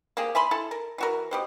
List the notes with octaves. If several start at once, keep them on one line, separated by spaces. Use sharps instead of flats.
A#3 C4 G4 G#4
E5 G#5 B5 C6
E4 A4 A5
A#4
E3 F#4 A#4
B2 G4 C5